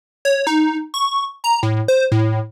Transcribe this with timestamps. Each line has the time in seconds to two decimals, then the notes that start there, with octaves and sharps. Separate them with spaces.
0.25 C#5
0.47 D#4
0.94 C#6
1.44 A#5
1.63 A2
1.88 C5
2.12 A2